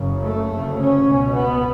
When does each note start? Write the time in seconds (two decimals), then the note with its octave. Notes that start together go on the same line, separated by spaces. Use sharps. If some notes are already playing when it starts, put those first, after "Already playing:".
Already playing: F#1 F#2 C#3
0.22 A3
0.49 D2 C#3
0.78 C#4
1.06 C#2 B2
1.35 B3